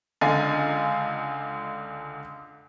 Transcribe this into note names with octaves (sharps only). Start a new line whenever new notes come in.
C#2 D3 D#5 F5 G#5 A6